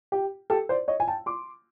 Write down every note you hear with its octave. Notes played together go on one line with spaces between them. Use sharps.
G4
G4 A4
C5 D5
C#5 D#5
G#5
G5 A5
C6 D6